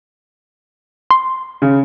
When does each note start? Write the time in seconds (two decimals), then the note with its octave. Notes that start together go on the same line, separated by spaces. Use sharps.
1.11 C6
1.62 C#3